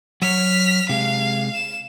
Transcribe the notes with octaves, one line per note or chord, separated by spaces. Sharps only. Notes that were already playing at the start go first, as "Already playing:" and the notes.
F#3 C#5 F6 B6
C3 G#3 F5
E7